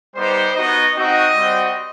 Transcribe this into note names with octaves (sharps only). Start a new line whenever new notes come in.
G3 B3 D#4 G4 C5
B3 D#4 F#4 D#5
C4 D#4 F#4 D#5
G3 C4 F#4